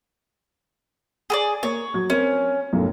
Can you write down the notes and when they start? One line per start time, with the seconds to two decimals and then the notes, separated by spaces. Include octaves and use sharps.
1.30 G#4 A#4 D5
1.63 A#3 C#5
1.94 F#3 G#6
2.10 C4 C#4 A#4
2.73 B1 F#2 A2